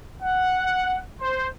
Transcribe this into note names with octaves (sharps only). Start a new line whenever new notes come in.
F#5
C5